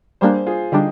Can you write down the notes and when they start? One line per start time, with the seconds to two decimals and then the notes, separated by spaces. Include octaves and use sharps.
0.21 G3 A#3 D4 G#4 C5
0.47 F4 G#4
0.72 D3 G3 D4 D#4 G4